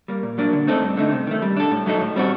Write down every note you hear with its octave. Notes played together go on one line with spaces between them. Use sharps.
G3 A#3
A#2
F#3 A#3 D4
D3
A3 C4 D#4 A4
G2
D3 A3 D#4
C3
D#3 A3
G3
D4 A4
A2
F#3 A3 D#4 A4
A2
G3 C4 F#4